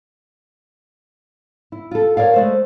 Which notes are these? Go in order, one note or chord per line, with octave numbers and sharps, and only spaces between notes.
E4
F4 A4
A#4 C#5 D5 F5
G#3 A3 C5